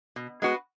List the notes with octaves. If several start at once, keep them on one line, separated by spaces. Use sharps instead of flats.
B2
G#3 B3 F#4 B4